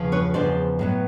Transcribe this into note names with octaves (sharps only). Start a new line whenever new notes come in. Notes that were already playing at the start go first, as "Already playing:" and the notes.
Already playing: E2 C#3 F3
B4 C#5
E2 C#3 F3 C5 D5
A2 F#3 B3